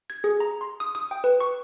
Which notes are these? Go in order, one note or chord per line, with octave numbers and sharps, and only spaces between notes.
G#6
G#4
A#5
C6
D#6
D#6
G5
B4
C#6